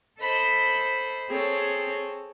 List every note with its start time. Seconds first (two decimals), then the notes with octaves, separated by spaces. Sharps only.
0.21 A4 C5 D#5 B5
1.30 C4 G#4 A4 C#5